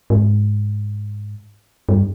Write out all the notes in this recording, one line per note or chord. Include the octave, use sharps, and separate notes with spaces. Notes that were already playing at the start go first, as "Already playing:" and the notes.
G#2
G2